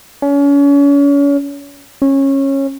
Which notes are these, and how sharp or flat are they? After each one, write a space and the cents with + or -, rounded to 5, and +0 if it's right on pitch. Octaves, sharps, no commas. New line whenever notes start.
C#4 +35
C#4 -20